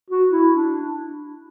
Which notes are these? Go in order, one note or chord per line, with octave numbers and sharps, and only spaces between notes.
F#4
E4
D4